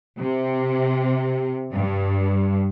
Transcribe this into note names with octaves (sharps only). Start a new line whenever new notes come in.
C3
G2